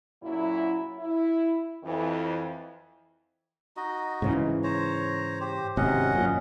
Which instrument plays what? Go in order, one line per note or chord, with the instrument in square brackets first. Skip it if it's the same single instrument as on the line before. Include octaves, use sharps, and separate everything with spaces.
[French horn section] F#2 A#2 F#3 E4
E4
F2 E3
[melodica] D#4 F#4 D#5
[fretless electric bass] G#2 C#3 E3
[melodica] C5 C#5 A#5
G4 C5
[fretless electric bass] G#1 C3 [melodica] C#4 D#5 F#5
[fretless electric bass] F#2 A#2